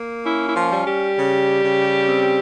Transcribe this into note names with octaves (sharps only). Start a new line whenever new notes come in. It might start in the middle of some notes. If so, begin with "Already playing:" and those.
Already playing: A#3
C#4 E4
E4
F3 F4
G3
G3 G4
C#3
C#3
C4